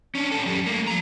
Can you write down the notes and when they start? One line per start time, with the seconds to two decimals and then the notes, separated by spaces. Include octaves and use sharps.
0.15 C#4 D4
0.31 C#4 A4
0.46 F#2 G3
0.66 A3 A#3
0.87 F3 A#5